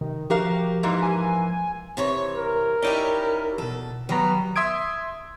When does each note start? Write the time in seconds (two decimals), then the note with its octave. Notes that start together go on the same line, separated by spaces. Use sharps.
0.01 C3 D#3
0.30 F3 F#4 G4 A#4 F5
0.83 G#2 E3 A#3
1.03 G#5
1.97 C3 E3 C#5
2.35 A#4
2.82 C#4 D#4 E4 G4 D5 D#5
3.58 E2 B2 A4
4.09 D#3 F#3 G3 B3 A#5
4.56 E5 C6 D#6 G#6 D7